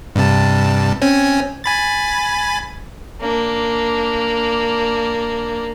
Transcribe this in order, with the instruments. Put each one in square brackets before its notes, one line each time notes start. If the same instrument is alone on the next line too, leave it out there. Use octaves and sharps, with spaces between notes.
[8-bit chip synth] G2 C3 A5
C4 C#4 G#5
G#5 B5 A6
[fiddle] A#3 D4